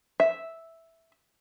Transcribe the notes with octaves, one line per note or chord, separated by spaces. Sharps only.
E5